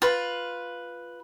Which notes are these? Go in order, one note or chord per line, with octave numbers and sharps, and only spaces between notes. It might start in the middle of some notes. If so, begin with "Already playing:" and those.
F4 B4